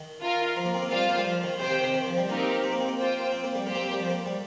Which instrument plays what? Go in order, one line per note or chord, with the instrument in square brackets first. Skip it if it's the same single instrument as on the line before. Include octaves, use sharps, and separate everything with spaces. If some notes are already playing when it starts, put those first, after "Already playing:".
Already playing: [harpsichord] D#3
[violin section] F4 A#4 F5
[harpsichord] F3
A#3
C4
A#3
[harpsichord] G3 [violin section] F4 C5 F5
[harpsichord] A#3
G3
F3
D#3
[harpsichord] C3 [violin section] G4 C5 G5
[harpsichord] D#3
C3
D#3
F3
G3
[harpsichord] A#3 [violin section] C4 D#4 G4 A#4
[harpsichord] C4
A#3
C4
A#3
[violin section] F4 C5 G5
[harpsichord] C4
A#3
G3
[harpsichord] A#3 [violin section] G4 C5 G5
[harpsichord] C4
A#3
G3
F3
A#3
G3